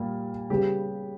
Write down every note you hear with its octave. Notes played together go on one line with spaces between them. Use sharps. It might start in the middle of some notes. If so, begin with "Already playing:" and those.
Already playing: A#2 G3 A#3
C#3 G3 B3 G4